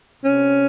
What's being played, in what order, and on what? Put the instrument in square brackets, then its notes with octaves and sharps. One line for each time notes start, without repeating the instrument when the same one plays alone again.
[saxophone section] C3 C#4